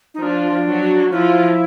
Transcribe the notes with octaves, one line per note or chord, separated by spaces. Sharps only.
D#4
F3 D4 F4
F#3 F#4
F3 E4 F4